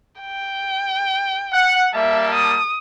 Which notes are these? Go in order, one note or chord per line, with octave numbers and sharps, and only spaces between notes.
G5
F#5
G3 A#3 E5 A5
D#6